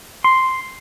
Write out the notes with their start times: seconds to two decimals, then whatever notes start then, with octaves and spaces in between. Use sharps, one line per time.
0.24 C6